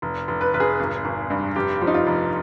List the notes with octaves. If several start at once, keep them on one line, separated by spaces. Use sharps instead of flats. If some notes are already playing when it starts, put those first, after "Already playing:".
F1
F1
B4
F1 B4
G#4
G#1
G#1
G2
F1 G4
F3
D#4
F4
F1